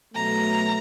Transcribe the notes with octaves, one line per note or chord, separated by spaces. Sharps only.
B2 F#3 A3 A#5